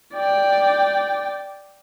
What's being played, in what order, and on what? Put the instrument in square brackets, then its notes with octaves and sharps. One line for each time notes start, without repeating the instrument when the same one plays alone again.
[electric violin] D5 G5